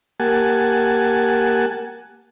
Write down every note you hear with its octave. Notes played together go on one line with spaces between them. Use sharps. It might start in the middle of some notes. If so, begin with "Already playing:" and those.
A#3 G4 F#5 G#5 A5